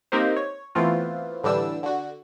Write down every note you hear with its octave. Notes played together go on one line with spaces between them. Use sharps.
A#3 C4 D#4 G4 A#4 C5
C#5
E3 A3 B3 C4 F4
A2 D3 E3 G3 D4 E6
D3 F#4